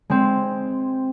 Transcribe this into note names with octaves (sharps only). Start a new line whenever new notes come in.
G#3 C4